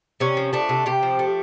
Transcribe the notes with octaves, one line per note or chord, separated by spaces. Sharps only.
C3 C#4
F3
A3 D4
C3
C3 G4
F3
A3